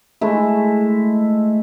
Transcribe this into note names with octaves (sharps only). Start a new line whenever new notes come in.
G#3 A3 E4